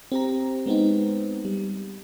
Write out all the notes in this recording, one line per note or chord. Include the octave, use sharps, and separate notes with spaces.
C4 G4 A#5
G#3 B3 C4 D#4
G3